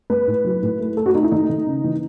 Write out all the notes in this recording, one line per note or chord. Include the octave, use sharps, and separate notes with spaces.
G#3 B4
A2
F#3
A2
A3
A3 A4
F#4
A3 D#4
E4
D#3 D#4
D#3
C#3
E3